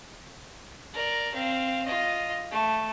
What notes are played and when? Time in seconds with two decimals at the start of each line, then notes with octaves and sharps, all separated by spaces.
0.94 A#4 D5
1.34 C4 F5
1.85 F4 D#5
2.51 A3